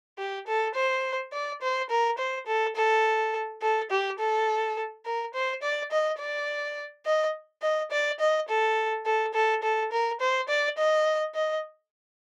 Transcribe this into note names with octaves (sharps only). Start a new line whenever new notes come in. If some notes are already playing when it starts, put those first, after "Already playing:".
G4
A4
C5
D5
C5
A#4
C5
A4
A4
A4
G4
A4
A#4
C5
D5
D#5
D5
D#5
D#5
D5
D#5
A4
A4
A4
A4
A#4
C5
D5
D#5
D#5